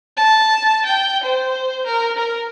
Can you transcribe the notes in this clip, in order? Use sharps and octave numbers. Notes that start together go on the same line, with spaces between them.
A5
G5
C5
A#4
A#4